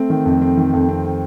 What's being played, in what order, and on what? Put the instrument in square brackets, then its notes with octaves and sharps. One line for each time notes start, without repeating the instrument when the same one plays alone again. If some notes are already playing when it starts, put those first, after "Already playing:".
Already playing: [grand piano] A3 C4
D#3
F2
C4
D#3
F2
C4
C4